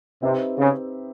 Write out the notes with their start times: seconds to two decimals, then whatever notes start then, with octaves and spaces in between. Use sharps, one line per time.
0.22 C3 C4 D#4 G4 B4 E5
0.58 C#3